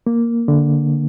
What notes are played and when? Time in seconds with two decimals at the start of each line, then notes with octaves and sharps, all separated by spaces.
0.07 A#3
0.48 D3